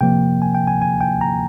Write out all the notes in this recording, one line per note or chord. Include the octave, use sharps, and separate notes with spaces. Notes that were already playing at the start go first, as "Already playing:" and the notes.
C3 F3 A#3 G5
G#5
G5
G#5
G#5
G5
A#5